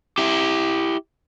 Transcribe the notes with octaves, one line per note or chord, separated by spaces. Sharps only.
E4 G4